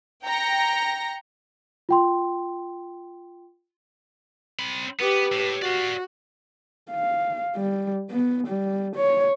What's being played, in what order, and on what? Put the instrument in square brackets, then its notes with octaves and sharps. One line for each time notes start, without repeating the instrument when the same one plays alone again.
[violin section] G5 A#5 A#6 C#7
[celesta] F4 G5 C6
[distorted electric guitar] C4 B5
[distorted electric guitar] B3 [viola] G4 B4
[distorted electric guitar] A2
[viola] F#4 [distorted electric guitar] D5 F5
[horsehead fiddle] F5
G3
B3
G3
C#5